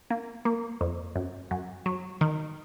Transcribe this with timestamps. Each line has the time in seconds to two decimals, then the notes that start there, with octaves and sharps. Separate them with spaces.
0.10 A#3
0.45 A#3
0.81 F2
1.16 F#2
1.51 F#2
1.86 F#3
2.21 D#3